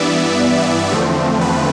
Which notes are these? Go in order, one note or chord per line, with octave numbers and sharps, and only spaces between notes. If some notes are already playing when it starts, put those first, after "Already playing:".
Already playing: G2 E3 B3 D5 E5
E2 D3 F3 A3 C4
B4